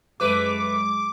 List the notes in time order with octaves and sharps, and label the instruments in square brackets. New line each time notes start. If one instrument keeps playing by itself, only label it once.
[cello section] F#2 G#3 [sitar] A3 B4 [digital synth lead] D6